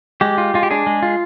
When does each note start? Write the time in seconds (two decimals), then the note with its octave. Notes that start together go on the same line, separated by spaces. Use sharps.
0.21 G#3 G4
0.38 F4
0.54 G#3 F4
0.63 G4
0.71 D4 G#4
0.87 G#3
1.03 F4